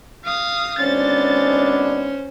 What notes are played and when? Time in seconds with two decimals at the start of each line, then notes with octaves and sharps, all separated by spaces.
0.24 F5 D#6
0.79 G#1 B3 C#4 D4 C5 A6